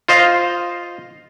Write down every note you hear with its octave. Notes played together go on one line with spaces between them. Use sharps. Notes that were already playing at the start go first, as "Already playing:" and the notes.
F4 C5 D#5 F5